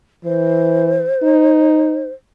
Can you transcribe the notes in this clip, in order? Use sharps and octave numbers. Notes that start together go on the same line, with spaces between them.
E3 C5
D#4